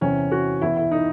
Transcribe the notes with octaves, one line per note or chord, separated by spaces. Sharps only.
E2 C3 E3 C#4
F#4
E2 B2 E4
E4
D#4